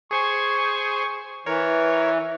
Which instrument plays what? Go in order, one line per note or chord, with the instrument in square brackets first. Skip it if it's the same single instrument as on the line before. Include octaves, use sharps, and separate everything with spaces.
[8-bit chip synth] G#4 C5 G#5 [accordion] C#6
[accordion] E3 [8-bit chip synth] A#4 C#5